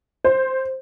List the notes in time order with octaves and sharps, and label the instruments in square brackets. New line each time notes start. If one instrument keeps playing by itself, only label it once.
[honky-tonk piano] C5